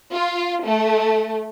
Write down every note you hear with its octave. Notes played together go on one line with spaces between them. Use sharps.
F4
A3